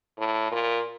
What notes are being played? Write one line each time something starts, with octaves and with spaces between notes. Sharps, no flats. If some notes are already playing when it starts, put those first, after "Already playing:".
A2
A#2